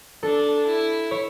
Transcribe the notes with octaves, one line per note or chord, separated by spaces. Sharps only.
D4 A4
E4
C#5